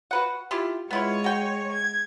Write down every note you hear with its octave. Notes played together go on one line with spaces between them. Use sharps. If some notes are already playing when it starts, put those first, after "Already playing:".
F#4 B4 F#5
E4 F4 G4
G#3 B3 E4 F4 C#5
F#4 G5
G#6